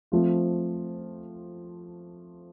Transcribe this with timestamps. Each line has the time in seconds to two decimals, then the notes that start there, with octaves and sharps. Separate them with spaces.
0.12 F3 A3 C4 F4